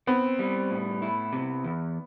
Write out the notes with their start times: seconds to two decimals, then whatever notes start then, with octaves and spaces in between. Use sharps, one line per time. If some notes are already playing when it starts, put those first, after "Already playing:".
0.07 B3 C4
0.39 G3
0.71 A2
1.02 E4
1.33 C3
1.64 E2